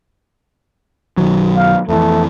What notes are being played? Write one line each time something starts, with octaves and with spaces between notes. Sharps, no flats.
B1 D#3 F#3
F5
F2 E3 A3